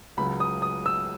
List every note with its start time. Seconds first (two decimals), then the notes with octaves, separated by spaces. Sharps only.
0.17 C#2 C#3 F#3 B5
0.40 D#6
0.62 D#6
0.86 E6